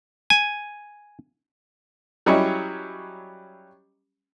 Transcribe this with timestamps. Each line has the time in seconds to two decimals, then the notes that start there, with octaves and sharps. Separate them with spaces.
0.30 G#5
2.26 F#3 G3 C#4 E4 C#5 D#5